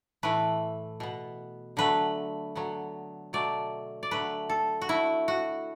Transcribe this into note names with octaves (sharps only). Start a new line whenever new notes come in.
A2 E3 A3 B4
B2 B3
D3 F#3 A3 B4
D3 F#3 B3
B2 F#3 A3 D5
D5
D3 F#3 A3 B4
A4
F#4
D3 A3 E4
F#4